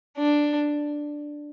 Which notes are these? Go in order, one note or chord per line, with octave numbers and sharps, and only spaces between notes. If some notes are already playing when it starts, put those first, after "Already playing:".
D4